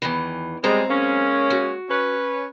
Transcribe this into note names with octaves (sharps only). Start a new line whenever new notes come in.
E2 D#3 E3
F#2 G3 G#3 C4 A#5
G#3 A#3 C#4
F#4
C#4 B4